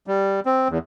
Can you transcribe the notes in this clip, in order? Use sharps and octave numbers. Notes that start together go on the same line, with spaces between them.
G3
C4
E2